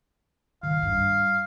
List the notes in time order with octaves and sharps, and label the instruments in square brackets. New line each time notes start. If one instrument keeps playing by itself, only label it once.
[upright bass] D#3 [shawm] F5
[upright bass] G2 D4